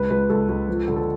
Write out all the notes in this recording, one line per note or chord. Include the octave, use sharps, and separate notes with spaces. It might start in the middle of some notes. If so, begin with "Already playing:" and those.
Already playing: C#2 B4
C#2 B4
C#2 A4
C#2
F3
D3
A4